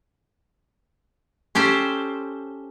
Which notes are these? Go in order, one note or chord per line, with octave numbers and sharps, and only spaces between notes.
C#4 G4 A4 C5